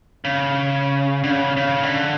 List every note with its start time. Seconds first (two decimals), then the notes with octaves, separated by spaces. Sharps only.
0.25 C#3
1.24 D3
1.30 C#3
1.57 C#3
1.83 D3